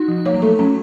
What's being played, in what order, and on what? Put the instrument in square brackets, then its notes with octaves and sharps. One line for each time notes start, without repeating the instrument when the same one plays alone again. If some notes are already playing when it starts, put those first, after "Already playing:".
Already playing: [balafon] D#4 [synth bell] F#4
[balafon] F3
[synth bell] A#3 [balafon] C#5
[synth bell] F#3
[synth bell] A3 [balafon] A4
[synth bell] F#3 [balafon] C#4